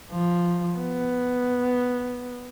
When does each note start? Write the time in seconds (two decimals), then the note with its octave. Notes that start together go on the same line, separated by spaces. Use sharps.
0.11 F3
0.76 B3